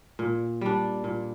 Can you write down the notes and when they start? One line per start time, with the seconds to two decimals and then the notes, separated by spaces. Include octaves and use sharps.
0.19 A#2
0.61 G3 D4
1.04 A#2